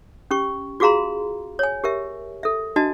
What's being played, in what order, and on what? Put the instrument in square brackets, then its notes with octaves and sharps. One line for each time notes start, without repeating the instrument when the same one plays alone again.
[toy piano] C#4 G4 C#6
F4 F#4 G#4 F5 A#5 C6
C#5 G#5
G4 A#4 E5
A4 E5
D4 F#4 D#5 A5